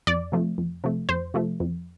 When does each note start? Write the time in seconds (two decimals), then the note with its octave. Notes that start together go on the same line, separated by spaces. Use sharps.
0.07 F2 D5
0.32 C3 F3 A3
0.58 F2
0.84 C3 F3 A3
1.09 F2 C5
1.34 C3 F3 A3
1.60 F2